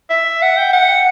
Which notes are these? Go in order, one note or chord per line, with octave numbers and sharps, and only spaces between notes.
E5
F#5
G5
F#5